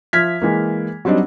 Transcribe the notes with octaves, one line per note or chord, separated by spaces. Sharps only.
F3 E5 F6 G#6 B6
E3 G#3 A#3
F#3 G3 C4 D4 D#4